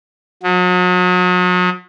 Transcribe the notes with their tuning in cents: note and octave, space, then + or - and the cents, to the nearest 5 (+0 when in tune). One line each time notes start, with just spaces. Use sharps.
F#3 -40